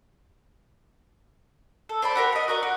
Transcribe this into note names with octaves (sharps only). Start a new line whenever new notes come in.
A4
C5 D5 A5 B5
F#4 G4 A#4
D#5 F#5
F#4 A#4 D5
F#4